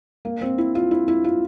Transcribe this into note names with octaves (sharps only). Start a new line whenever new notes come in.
A#3
C4
E4
F4
E4
E4
F4